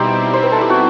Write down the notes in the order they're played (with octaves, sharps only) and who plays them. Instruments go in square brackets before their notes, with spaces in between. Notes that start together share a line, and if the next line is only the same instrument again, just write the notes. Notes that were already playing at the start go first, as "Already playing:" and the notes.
Already playing: [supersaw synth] B2 G3 C4 E4 [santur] D#4 G4 C5
[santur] C5
B4
A4
G4
F#4